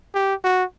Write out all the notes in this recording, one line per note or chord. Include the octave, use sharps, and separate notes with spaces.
G4
F#4